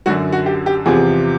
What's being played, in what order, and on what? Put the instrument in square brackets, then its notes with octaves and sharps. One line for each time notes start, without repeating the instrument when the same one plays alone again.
[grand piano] F#2 D3 F#3 F#4
F#4
G4
G4
E2 C3 F3 G#4